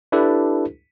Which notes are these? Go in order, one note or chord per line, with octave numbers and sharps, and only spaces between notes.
D4 E4 G4 A4 B4